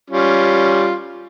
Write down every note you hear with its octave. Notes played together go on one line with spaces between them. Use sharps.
G3 C#4 F4